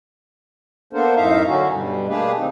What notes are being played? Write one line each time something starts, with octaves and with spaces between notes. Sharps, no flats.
A#3 B3 D4 A4 A#4 C5
F#2 A2 D#4 E5 F5 A#5
D3 F#3 C#4 F#4
G2 B2 G3
A3 A#3 D4 G4 G#4 B4
D#3 C4 D#4